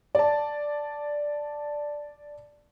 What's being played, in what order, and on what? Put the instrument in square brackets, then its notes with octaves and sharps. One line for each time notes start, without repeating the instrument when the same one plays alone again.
[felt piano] D5 A5